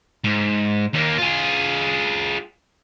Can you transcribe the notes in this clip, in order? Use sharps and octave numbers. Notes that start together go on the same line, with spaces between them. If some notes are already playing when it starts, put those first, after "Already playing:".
G#2
D#2 A#3
F4 G#4